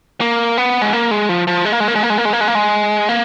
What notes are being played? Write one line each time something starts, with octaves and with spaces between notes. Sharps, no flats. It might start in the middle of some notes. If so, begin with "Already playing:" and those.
A#3
B3
G#3
A#3
G#3
F3
F3
G#3
A#3
G#3
A#3
G#3
A#3
G#3
A#3
G#3
A#3
G#3
A#3
G#3
A#3